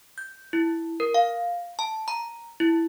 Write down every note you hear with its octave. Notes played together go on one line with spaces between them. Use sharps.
G6
E4
A#4
F5
A5
A#5
E4